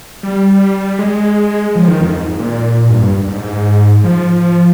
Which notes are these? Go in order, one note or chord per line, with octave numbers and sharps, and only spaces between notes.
G3
G#3
F3
D#3
F2
G#2
A#2
G2
G2
G#2
F3